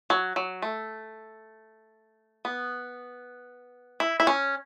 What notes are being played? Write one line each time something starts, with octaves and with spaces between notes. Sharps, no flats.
F#3
F#3
A3
B3
E4
E4
C#4